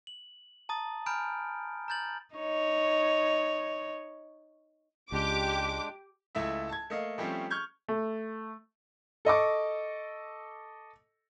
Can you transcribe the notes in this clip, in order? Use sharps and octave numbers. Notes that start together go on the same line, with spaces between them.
F#7
A5 A#5 D#6 A6
G#5 A#5 B5 F6 G6 D7
A#5 F6 G6 A6 F#7
D#4 C#5
C#2 G#3 D4 G4 D6
C#2 A3 E4 E5
A5 G#6
A3 A#3 D#5 F5
F3 G3 A3 C4 C#4 G4
C#6 F6 G6 G#6
A3
A4 D#5 C#6 D6